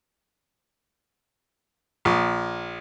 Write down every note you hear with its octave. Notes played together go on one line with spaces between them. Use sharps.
A#1